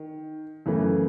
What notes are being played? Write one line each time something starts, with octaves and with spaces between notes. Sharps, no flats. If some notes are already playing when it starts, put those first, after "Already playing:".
Already playing: D#3
F#2 C#3 E3 A3